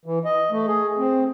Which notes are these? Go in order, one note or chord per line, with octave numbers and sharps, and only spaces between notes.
E3
D#5
A3
G#4
C4